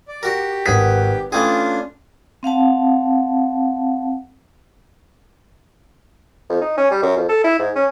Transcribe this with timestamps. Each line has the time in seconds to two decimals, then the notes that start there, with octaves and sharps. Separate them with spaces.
0.08 D5
0.23 F#4 G4 A#4
0.66 G#1 G#4 B4 F#5 B6
1.32 E3 A3 C#4 D4 F4 G#4 G5
2.43 C4 F5 F#5 A5
6.50 F2
6.62 D#4
6.77 C#4
6.91 G3
7.03 F#2
7.17 F2
7.29 A4
7.44 E4
7.59 G#2
7.76 C#4